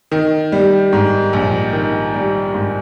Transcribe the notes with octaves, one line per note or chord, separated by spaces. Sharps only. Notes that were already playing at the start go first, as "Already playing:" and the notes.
D#3
G3
G#2
A#1
D#3
G3
G#2